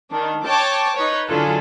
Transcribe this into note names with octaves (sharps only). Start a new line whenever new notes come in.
D#3 D4
C#5 G5 A5 D6
D#4 B4 C#5
D3 F#3 E4 F4 G#4 A4